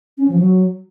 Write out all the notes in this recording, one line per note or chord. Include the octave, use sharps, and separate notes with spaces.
C#4
F3
F#3